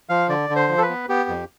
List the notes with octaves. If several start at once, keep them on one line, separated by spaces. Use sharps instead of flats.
F3 F5
D3 D5
D3
C5
F3
A4
B4
B3
B3 G4
F2